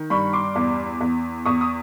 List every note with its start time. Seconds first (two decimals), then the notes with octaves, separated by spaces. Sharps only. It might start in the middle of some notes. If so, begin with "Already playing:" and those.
Already playing: D#3
0.10 G2 B5 C#6
0.33 C6 D6
0.55 E2
1.01 E2
1.45 E2 C#6 D#6
1.61 D#6